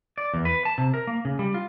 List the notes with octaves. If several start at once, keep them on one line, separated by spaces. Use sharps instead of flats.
D5
E2
B4
A5
C3
A#4
A#3
C#3
G3
F4